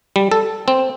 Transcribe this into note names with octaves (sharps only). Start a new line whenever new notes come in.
G3
A4
C4